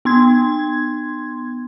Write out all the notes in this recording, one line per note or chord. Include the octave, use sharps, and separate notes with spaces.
B3 C6 G#6